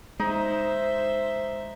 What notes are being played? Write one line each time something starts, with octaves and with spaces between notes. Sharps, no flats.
G#3 D#4 C5 E5